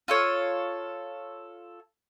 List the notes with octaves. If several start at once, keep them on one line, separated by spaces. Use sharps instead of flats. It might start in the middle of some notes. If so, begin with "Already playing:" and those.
F4 A4 C#5